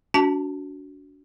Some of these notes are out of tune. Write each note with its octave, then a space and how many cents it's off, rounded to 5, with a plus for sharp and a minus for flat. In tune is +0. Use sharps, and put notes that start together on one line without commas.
D4 -40 F#4 +0 A5 +0